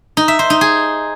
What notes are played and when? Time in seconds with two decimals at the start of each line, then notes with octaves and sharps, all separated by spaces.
0.17 D#4
0.28 E5
0.39 C5
0.50 D#4
0.61 G#4